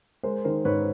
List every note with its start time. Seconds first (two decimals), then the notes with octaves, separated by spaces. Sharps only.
0.23 G#3 A#4 C5
0.44 D#3 A#4 C5
0.65 G#2 B4 C#5